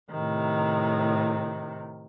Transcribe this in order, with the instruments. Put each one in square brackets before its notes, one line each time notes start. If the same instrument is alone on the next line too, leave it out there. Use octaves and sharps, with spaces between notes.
[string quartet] A2 C3 D#3